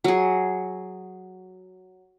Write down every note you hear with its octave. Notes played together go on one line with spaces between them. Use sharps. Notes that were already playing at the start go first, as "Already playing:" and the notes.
F#3 G#4